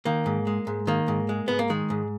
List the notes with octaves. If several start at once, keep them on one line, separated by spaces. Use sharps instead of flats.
D#3 A#3
G#2
G#3
G#2
D#3 A#3
G#2
G#3
G#2 B3
A#3
D#3 G#3
G#2